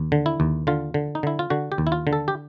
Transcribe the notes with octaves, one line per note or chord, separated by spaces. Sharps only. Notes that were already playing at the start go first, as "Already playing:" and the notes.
Already playing: D#2
D3
E4
D#2
D3 F4
D3
D#4
D3 E4
F4
D3 F#4
G4
D#2
E4
F4
D3
A4
G4